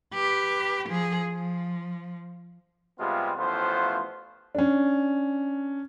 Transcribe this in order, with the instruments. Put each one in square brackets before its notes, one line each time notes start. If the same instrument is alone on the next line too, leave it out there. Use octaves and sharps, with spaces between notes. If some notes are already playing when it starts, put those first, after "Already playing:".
[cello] G4 B4
F3 G#4
F3
[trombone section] C3 G3 G#3 B3 F4
A1 A2 F3 B3 F4 C5
[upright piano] C#4 D4